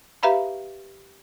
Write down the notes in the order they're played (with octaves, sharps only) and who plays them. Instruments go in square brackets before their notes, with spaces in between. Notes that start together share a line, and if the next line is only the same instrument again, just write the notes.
[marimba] G4 B4 E5 F5 A#5 B5